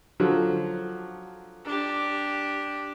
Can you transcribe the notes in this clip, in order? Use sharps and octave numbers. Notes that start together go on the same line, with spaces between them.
D3 F3 F#3
D4 G4